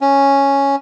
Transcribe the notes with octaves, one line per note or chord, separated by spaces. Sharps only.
C#4